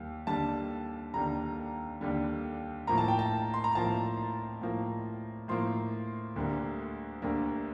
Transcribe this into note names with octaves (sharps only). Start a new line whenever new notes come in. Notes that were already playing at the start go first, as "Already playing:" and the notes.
Already playing: D#2 G3
D#2 D3 G3 A5
D#2 D3 G3 A#5
D#2 D3 G3
A2 F3 A#3 A#5
A5
G5
A5
C6
A#5
A2 F3 A#3 A5
A2 F3 A#3
A2 F3 A#3 C6
D2 D3 G3 A#3
D2 D3 G3 A#3